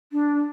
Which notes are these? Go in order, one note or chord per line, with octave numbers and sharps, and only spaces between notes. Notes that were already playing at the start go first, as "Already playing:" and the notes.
D4